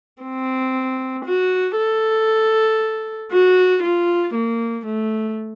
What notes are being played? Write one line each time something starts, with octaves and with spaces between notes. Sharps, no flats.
C4
F#4
A4
F#4
F4
A#3
A3